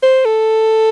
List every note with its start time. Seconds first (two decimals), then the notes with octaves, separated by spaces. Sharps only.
0.03 C5
0.25 A4